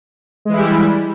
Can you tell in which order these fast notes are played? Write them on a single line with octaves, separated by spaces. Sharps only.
G#3 E3 E4 G3